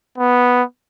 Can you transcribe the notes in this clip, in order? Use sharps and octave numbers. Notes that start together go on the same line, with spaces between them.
B3